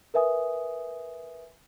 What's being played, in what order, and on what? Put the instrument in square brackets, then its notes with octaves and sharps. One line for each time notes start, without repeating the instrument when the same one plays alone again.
[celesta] A#4 B4 E5 G#5 D#6